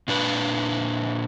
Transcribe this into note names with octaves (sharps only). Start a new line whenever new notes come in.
A#2 D4 B4